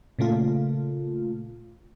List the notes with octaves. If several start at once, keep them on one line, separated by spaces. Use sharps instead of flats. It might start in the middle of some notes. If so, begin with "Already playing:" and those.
A#2 C#3 A3 F4